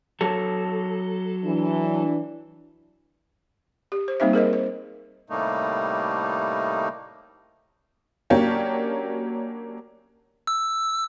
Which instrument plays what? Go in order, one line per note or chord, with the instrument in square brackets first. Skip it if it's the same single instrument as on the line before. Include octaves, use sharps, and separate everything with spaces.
[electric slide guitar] F#3 A4
[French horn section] E3 D4
[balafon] G4
C5
G3 A#3 C4 D#4 C5 E5
G#4 A#4 C5 D#5
C5
[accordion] A2 C3 G3 A3 A#3 D#4
[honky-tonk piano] F#3 A#3 C#4 D4 G4
[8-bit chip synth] E6